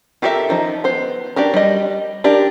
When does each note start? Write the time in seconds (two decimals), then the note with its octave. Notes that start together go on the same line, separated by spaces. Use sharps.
0.22 F4 G4 A4 A#4 E5
0.49 D#3 F3 D#4
0.84 B3 C5
1.36 D4 F#4 G4 A#4
1.54 G3 D#5
2.24 D4 G4 A#4